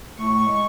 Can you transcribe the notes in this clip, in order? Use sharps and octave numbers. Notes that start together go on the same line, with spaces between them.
A2 A3 C#6
G#3